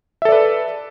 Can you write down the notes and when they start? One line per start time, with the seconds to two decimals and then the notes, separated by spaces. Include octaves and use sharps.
0.22 E5
0.25 A4
0.29 D5
0.32 B4